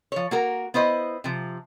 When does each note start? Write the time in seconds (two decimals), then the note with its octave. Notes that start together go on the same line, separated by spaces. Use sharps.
0.12 F3 C#5
0.31 A#3 F#4 A#4
0.74 B3 E4 C5 D#5
1.24 C3 F3